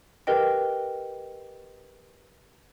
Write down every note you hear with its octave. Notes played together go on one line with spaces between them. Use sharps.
G4 A#4 B4 D#5 G5